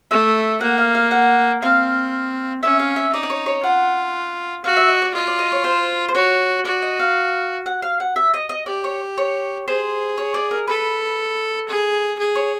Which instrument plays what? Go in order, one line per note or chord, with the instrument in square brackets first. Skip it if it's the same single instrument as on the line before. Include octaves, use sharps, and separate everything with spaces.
[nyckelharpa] A3 [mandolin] E5
[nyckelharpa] A#3 [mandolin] F#5
[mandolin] F5
F5
F#5
[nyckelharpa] C4 [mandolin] F5
[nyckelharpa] C#4 [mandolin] E5
[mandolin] F5
E5
[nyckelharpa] D#4 [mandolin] D5
[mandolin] D5
C#5
C#5
[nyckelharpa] F4 [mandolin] F#5
[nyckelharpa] F#4 [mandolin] F5
[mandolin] E5
D#5
D5
[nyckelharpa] F4 [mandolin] D#5
[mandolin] D5
D#5
C#5
C5
C5
[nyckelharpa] F#4 [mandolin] C#5
[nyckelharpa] F#4 [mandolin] D5
[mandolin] D#5
F5
F#5
F5
F#5
E5
D#5
D#5
[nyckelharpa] G4 [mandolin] D5
[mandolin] C#5
C#5
[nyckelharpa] G#4 [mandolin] C5
[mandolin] C#5
D5
A#4
[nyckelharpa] A4 [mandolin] B4
[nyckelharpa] G#4
G#4
[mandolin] C#5